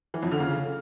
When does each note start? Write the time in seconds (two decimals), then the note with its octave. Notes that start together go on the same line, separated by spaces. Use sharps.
0.14 E3
0.23 F2
0.31 D3
0.40 C#3